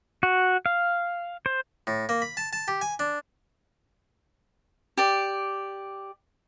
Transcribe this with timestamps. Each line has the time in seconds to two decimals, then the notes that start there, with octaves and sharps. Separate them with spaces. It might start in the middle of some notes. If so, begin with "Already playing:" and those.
0.23 F#4
0.66 F5
1.46 C5
1.87 A2
2.09 A#3
2.22 B5
2.37 A5
2.53 A5
2.68 G4
2.81 G#5
2.99 D4
4.97 G4 D5